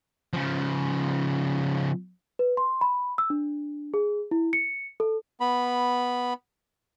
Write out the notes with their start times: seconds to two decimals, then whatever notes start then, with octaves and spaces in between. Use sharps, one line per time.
0.33 C#3 F3
2.39 B4
2.57 C6
2.81 B5
3.18 E6
3.30 D4
3.94 G#4
4.31 E4
4.53 C#7
5.00 A4
5.40 B3 B5